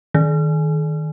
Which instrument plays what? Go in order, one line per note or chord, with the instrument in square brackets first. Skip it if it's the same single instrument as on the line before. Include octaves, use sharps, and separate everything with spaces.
[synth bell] D#3